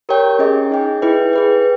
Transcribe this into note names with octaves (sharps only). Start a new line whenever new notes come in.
G4 A#4 C#5 G5
C#4 G#4 D#5
D#4 G#4 D#5 G5
E4 G#4 B4 G5
G#4 B4 G5